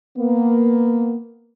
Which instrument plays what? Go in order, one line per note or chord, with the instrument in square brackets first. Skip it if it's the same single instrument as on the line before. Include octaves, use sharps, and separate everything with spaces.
[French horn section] A#3 B3